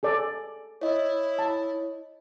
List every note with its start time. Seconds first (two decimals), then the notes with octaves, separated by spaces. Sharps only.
0.03 G#4 A4 D5
0.81 E4 C#5 D#5
1.39 A5